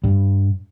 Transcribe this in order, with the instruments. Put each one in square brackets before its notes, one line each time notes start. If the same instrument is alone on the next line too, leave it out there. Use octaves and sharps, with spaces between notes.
[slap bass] G2